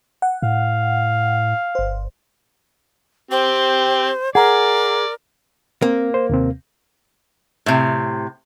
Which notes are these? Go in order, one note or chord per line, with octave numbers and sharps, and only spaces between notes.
F#5
A2 F5
G1 C5
C4 G4 C5
G#4 A#4 D5 F#5 A#5
A#3 C4
C5
D#2 C3 C4
A2 C3